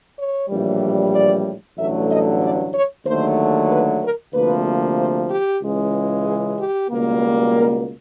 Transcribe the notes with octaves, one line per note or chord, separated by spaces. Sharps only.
C#5
A#1 A2 E3 G3
D5
A1 G2 D3 F#3 A3 E5
D#5
D5
C#5
D#2 D3 F#3 A3 C5
B4
A#4
D2 C3 F3 A#3 B4
C5
G4
C#2 C#3 E3 G#3
G#4
G4
C#2 B2 G3 A#3
A#4